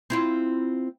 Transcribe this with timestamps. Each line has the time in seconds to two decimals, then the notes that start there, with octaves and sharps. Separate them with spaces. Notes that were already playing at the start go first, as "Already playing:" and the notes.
0.10 C4 E4 F4